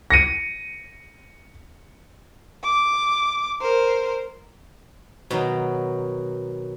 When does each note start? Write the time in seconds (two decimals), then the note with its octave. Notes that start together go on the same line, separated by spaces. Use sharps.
0.10 A#6 C#7 D#7
2.63 D6
3.61 A#4 C5
5.31 B2 D#3 F#3